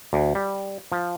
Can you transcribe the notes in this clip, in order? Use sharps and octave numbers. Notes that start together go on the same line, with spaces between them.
D2
G3
F3